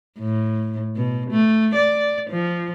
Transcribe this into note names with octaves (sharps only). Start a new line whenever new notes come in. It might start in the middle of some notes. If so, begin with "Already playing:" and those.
A2
B2
A3
D5
F3